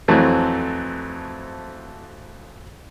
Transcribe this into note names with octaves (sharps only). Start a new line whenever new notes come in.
F2 E3 F#3 A3 C4